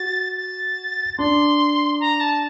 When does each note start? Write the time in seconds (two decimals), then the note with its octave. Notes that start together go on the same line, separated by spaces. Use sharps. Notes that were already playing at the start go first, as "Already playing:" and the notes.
Already playing: F#4 A6
0.37 A6
1.18 D4 C6
2.00 A#5
2.20 A5